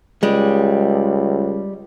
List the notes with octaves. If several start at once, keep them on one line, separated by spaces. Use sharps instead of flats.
C#2 G3 G#3